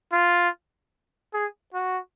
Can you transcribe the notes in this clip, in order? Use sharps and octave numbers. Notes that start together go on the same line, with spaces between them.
F4
G#4
F#4